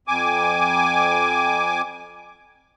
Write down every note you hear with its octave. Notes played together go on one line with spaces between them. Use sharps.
F2 G#5 D6